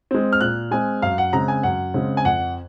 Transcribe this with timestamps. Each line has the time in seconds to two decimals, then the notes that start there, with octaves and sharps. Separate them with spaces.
0.11 G#3 C4
0.33 F6
0.41 A#2 F#6
0.71 G#3 C4 G#5
1.02 F#2 F5
1.18 F#5
1.33 C#3 G#3 C4 A#5
1.48 G#5
1.63 F#2 F#5
1.94 C#3 G#3 C4
2.17 G#5
2.25 F2 F#5